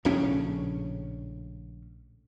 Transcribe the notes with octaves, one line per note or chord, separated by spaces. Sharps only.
A#1 A2 C#3 C#4